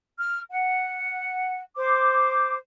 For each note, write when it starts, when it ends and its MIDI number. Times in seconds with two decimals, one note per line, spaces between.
0.18 0.39 89
0.50 1.59 78
1.75 2.55 72
1.75 2.55 86